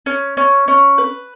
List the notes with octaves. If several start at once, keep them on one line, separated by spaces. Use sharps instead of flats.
C#4
C#4
C#4
B4